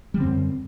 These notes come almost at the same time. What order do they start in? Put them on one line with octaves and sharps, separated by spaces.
G3 D3 C4 F#2